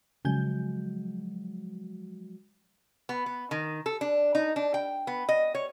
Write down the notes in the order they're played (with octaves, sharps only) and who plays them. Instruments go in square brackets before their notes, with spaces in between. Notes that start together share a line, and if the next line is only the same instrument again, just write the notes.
[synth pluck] C#3 G#5 G6 [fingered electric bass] F3 F#3 G#3
[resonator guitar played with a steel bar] B3
B3
D#3
A4
D4
D#4
D4
G5
B3
D#5
C#5